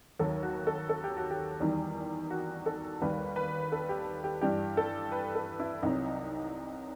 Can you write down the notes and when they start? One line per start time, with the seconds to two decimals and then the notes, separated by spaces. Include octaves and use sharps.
0.19 D#2 D#3 F#3 A4
0.43 F#4
0.67 A4
0.89 A4
1.04 G4
1.17 F#4
1.31 G4
1.60 E2 D#3 G3
2.30 F#4
2.66 A4
3.02 D#2 D#3 G3 B4
3.36 B4
3.72 A4
3.89 G4
4.24 G4
4.41 G2 E3 G3 G4
4.77 A4
5.12 B4
5.35 A4
5.60 E4
5.83 C2 C3 F#3 D#4